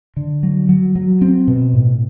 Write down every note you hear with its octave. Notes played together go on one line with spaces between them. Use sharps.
D3
F#3
F#3
F#3
C4
B2
A2